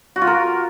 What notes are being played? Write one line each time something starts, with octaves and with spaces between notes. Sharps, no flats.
F#4
F4
A#4